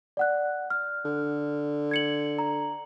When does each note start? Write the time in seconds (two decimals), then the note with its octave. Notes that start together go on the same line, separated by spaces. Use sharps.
0.17 D5 F#5 F#6
0.70 F6
1.05 D3
1.91 G#6 C#7 F#7
2.39 A#5